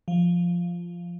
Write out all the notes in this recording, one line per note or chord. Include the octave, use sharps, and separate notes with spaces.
F3